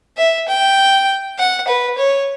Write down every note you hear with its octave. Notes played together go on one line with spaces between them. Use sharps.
E5
G5
F#5
B4
C#5